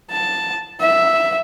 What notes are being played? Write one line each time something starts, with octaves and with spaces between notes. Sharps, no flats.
A5
E5